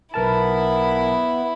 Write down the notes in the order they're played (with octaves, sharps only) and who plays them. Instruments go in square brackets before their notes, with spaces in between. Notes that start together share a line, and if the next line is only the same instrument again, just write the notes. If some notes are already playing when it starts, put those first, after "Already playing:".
[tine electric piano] B1 A#4 A5 [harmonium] B3 [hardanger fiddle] E4